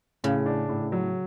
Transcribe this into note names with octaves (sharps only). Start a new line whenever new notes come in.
A2 C#3
D4
A2
F#3